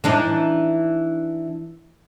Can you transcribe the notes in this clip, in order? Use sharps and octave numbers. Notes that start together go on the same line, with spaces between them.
E3 D4 D#4